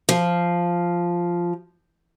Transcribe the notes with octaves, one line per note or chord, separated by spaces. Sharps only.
F3